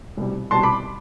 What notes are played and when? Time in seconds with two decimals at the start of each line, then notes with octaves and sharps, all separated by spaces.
0.17 C2 B2 G3
0.51 C2 B2 G3 A5 C6
0.63 B5 D6